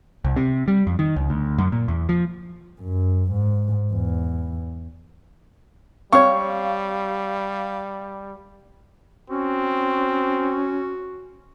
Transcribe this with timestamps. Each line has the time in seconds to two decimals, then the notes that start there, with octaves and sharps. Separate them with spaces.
0.25 C2
0.36 C3
0.68 G3
0.87 F2
0.99 D#3
1.16 C#2
1.30 D2
1.58 F#2
1.72 A#2
1.88 E2
2.09 F3
2.81 F#2
3.31 G#2
3.93 E2
6.12 G3 C4 C#5 F5 C#6
9.30 C4 C#4 F#4